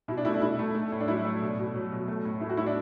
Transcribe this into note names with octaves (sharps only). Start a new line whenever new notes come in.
B2 E4
D4
A3 E4
D4
B2 E4
A3
A3
A2
D4
F#3 E4
A3
B2
B2
F#3
B2
A3
A2
A3 E4
F#4
A2 E4
D4